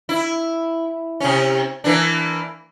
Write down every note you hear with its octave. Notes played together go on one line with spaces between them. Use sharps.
E4
C3 C#4
E3 A#3 D4